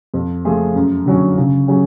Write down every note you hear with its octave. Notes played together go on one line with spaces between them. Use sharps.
F2
F3 A3 F4 G#4
F#2
D3 F#3 C#4
C#3
F#3 C#4 G#4